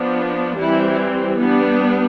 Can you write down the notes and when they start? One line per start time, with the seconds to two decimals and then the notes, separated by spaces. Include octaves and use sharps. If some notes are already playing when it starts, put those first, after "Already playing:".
Already playing: F3 B3 D4
0.58 E3 G3 C4 E4
1.41 G3 B3 D4